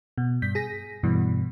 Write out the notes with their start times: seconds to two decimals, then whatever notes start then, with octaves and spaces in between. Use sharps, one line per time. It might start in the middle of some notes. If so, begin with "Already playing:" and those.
0.18 B2
0.42 G2 G6 B6
0.55 G#4 A#6 B6
1.03 G2 B2 E3